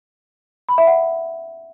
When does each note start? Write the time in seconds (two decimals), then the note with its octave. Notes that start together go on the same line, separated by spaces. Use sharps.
0.69 B5
0.78 E5
0.87 F#5